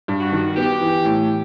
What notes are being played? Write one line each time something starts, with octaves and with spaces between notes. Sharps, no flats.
G2
F#4
D#3
B3 G4
E3
A2